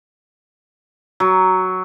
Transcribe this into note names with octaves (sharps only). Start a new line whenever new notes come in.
F#3